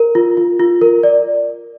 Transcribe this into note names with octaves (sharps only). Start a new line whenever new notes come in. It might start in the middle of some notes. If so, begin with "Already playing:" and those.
Already playing: A#4
F4
F4
F4
A#4
D5